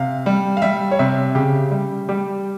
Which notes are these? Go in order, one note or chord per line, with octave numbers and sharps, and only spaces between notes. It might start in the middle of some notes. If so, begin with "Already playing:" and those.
Already playing: C3 F5
G3
F5
G3 E5
C#5
C3 E5
C#3 G4
G3
G3 G4